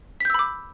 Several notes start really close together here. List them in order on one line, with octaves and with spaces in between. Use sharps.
B6 G6 E6 B5 D6